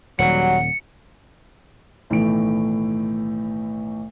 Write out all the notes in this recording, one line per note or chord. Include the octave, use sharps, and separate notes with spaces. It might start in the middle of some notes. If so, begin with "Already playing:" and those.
D#1 F#3 G3 F#5 C#7
B1 A2 D#3 E3 A3 D7